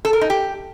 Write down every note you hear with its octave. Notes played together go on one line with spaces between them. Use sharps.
A4
A#4
D#4
G4